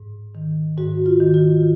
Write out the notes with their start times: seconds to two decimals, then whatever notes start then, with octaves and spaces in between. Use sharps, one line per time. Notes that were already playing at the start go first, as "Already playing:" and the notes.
Already playing: G#2
0.35 D#3
0.78 G#2 F#4
1.06 F4
1.20 D#3
1.34 F4